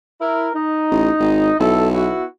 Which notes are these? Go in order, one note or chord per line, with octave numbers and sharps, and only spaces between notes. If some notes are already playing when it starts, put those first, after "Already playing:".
E4 A#4
D#4
A1
G#1
B1 E4 A4
B3 E4 F#4